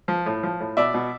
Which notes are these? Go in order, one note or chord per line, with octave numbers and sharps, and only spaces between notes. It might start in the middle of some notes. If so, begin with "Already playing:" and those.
F3
A2
F3
A2
B2 D5 E5
B2